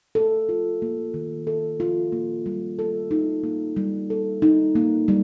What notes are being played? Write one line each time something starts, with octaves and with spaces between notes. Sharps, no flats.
A4
F4
A#3
D#3
A4
F4
A#3
G3
A4
D#4
A#3
G3
A4
D#4
A#3
G3